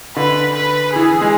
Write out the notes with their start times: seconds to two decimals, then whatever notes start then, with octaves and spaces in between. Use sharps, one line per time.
0.16 D3 B4
0.56 B4
0.95 E3 G#4
1.21 G#3